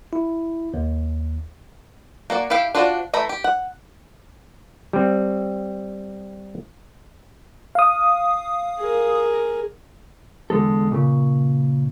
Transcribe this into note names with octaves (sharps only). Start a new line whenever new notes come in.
E4
D#2
A#3 F#4 D5
E4 G4 E5 F5 G5
D4 F4 F#4 C5 D5
E3 A3 A#5 B5
G4
F#5
G3 C4
F5 D#6
G#4 A#4
E2 D3 G#3 A4
A#2 C#3